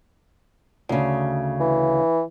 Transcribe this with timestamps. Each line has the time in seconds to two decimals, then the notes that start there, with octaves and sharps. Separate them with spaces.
0.89 D2 C#3
1.60 E3